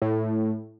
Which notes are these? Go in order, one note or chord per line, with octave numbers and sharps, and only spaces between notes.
A2